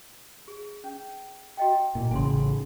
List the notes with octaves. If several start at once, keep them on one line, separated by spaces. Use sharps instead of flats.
G#4
C#4
F#4 D#5 G5
A#2 E4
A1 C#3 G#5 C6